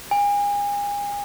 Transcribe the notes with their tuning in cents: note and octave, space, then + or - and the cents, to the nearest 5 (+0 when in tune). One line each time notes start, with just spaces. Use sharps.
G#5 -35